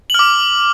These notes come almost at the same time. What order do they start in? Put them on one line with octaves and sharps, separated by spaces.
F#7 F6 D6